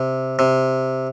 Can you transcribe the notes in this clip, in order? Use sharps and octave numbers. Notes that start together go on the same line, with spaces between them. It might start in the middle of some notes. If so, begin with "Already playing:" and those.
Already playing: C3
C3